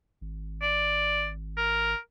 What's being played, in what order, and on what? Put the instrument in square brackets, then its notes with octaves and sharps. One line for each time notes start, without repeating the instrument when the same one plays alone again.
[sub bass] G#1
[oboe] D5
A#4